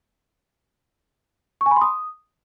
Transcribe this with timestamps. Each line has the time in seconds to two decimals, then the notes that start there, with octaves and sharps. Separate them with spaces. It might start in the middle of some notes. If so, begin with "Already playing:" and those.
1.61 C#6
1.66 G#5
1.71 B5
1.76 C6
1.81 D#6